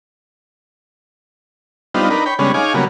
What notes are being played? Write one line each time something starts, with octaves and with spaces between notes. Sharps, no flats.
G3 B3 C4 D4 D#4 F4
D4 D#4 A#4 B4
C#5 G5 B5
C#3 G3 G#3 B3 C#4 D4
D#4 G#4 C#5 F5 G#5 D6
C#3 F#3 G3 A#3 B3